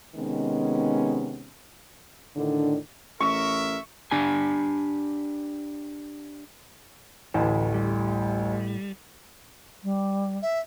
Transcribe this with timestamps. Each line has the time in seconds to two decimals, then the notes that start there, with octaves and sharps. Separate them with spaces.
0.15 C3 D#3 G#3 B3 C#4
2.36 A2 D3 D#3 D4
3.20 A1 A#4 E5 C#6
4.11 D4 G4 G#5
7.34 A1 D2 A2 E3 F#5 A5
7.74 G3
9.83 G3
10.42 E5